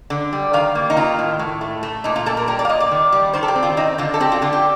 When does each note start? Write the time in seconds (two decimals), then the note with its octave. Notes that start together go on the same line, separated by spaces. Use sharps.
0.10 D3
0.33 G3
0.53 D#3 F5
0.75 A#3
0.90 D#4
0.96 D#3 F4
1.19 A2
1.39 A2
1.61 A3
1.83 A3
2.04 A#2 D#4
2.16 F4
2.26 A#2 A4
2.37 A#4
2.48 G3 A#4
2.59 D5
2.65 F5
2.69 A#2 D#5
2.80 D5
2.91 D#3
3.12 G3
3.34 D#3 C5
3.43 A4
3.48 G4
3.55 C4
3.63 F4
3.77 C4 D#4
3.98 D3 F4
4.14 A4
4.20 C4 G4
4.32 F4
4.42 D3 F4
4.53 G4